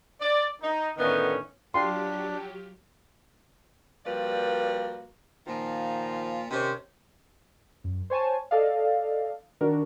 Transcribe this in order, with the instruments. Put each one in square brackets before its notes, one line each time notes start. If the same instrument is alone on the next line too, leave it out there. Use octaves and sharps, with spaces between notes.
[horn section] D5
D#4
A2 D3 D#3 B3 C#4 D#4
[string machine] F#3 G4 [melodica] D4 [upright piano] F4 [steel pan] G5 C6
[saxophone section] F3 G3 A#3 F#4 B4 D5
A#2 D#3 F3 F4
C3 D#3 C#4
[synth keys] F#2
C5 C#5 G#5 A5
A4 D5 D#5 F5
D#3 D4 F#4 A#4